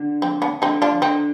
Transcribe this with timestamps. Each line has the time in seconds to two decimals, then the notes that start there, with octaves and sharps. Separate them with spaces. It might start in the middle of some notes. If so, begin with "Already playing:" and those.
Already playing: D3
0.22 F2 C4
0.42 B3 D4
0.62 D3 C4 D#4
0.82 D4 F4
1.02 D3 C4 D#4